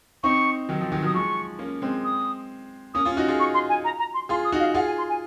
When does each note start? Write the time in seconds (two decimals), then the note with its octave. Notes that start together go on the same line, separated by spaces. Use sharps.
0.24 C4 D#4 C#6
0.69 D#3 F#3
0.81 F3
0.92 D#3 F#3
1.02 D#3 F#3
1.06 D#6
1.14 F3 G#3 C#6
1.59 A#3 C#4
1.82 G#3 C4
2.05 D#6
2.94 A#3 C#4 D#6
3.05 C#4 F4
3.17 D#4 F#4
3.28 F4 G#4
3.40 C#6
3.54 C6
3.69 G#5
3.85 A#5
3.99 A#5
4.14 C6
4.29 F4 G#4 C6
4.45 D#6
4.52 D#4 F#4
4.60 F5
4.74 F4 G#4 F#5
4.86 G#5
4.98 C6
5.09 G#5